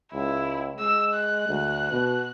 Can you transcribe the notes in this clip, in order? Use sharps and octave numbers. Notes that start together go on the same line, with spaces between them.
C#2 E4
G#3 E6
F#6
D2
B2